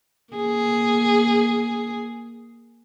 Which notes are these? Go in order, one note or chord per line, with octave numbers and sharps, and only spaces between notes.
A#3 G#4